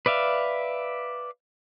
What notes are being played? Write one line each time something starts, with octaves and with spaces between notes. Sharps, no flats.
B4 D5 E5 F5